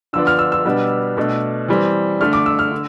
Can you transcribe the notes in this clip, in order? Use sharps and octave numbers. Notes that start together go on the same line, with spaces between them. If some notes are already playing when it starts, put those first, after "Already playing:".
D3 F3 B3 D4 E6
F6
E6
E6
B2 G3 B3 D4
B2 A3 D4
E3 G3 C4
D3 A3 D4 F6
D6
E6
F6
D3